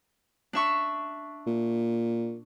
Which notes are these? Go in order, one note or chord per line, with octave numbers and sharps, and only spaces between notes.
D4 E5 C#6
A#2